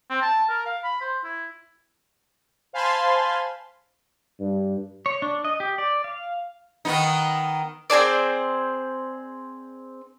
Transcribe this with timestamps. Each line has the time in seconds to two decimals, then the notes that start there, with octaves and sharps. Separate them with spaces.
0.10 C4
0.22 A5
0.49 A#4
0.66 F5
0.84 B5
1.01 C5
1.24 E4
2.73 C5 F5 G#5 A5 B5 C6
4.40 G2
5.06 C#5
5.22 D4
5.45 D#5
5.60 G4
5.78 D5
6.04 F5
6.85 D#3 B3 D#4
7.90 C4 G#4 C5 D5